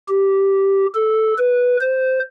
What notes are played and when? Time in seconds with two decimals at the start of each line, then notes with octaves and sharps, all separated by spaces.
0.08 G4
0.95 A4
1.38 B4
1.81 C5